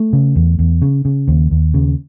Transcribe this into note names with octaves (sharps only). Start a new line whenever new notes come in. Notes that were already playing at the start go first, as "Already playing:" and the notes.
Already playing: A3
C#3
E2
E2
C#3
C#3
D#2
D#2
C#3